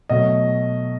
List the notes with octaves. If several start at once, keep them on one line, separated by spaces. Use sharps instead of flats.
B2 F#3 A3 D#5